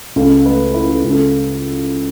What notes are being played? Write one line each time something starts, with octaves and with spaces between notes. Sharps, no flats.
C#2 A4
A3 B4
E4 B4
A4
C#2
A4